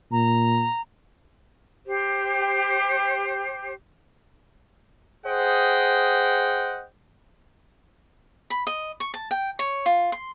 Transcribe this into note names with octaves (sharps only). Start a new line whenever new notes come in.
A#2 A#5
G4 C5
G#4 C5 D#5 F#5 G5
B5
D#5
C#6
A5
G5
C#5
F4
C6